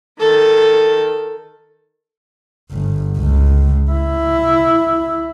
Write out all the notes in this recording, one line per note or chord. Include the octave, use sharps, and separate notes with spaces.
D#3 A4
G1
C#2
E4